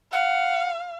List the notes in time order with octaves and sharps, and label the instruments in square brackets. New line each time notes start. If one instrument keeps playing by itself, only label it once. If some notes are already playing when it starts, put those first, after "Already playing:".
[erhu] F5 [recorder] F#5